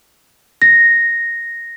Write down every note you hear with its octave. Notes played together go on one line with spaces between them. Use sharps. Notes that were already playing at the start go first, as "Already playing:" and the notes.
A#6